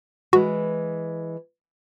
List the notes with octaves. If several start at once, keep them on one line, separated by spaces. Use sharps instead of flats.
E3 G#3 F#4